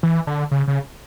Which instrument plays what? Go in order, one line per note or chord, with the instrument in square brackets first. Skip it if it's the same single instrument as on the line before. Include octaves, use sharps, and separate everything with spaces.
[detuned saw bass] E3
D3
C#3
C#3